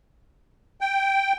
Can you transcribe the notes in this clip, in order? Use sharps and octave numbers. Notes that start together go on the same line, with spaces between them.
G5